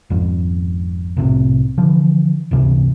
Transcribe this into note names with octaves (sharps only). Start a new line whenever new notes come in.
G#1 F2
C2 A2 C3
D3 E3 F3
G1 C#2 C3 E3